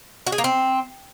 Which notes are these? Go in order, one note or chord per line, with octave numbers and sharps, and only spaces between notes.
F#4
G#4
A#3
C4